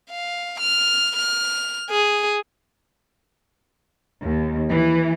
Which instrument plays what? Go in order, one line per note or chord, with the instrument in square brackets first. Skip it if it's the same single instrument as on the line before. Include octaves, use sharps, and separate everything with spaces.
[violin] F5
F6
F6
G#4
[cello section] D#2
E3